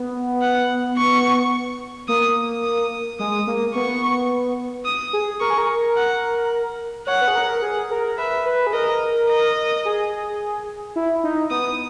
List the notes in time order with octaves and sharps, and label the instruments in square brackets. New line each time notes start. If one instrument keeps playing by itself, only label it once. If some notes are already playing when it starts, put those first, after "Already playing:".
Already playing: [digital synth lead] B3
[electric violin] F#5
C#6
[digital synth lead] A#3 [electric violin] D#6
[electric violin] D#6
[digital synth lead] G#3 [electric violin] D#6
[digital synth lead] A#3
[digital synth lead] B3 [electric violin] C#6
[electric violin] D#6
[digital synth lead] G#4
[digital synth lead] A#4 [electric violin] C#6
[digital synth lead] G#4
A#4
[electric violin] F#5
[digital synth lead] C#5 [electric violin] F#5
[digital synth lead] B4
G#4
A#4
A#4
G#4
A#4
[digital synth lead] B4 [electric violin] E5
[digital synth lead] B4
G#4
[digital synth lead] A#4 [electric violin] D#5
[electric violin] D#5
[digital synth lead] G#4
E4
D#4
[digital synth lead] B3 [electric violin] D#6